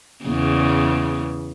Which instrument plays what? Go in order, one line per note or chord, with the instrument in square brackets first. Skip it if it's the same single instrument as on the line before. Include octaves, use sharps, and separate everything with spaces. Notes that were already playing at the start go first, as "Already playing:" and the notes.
[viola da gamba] E2 C#3